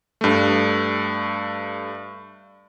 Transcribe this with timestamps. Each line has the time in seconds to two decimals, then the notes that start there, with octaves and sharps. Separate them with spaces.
0.21 G2 A3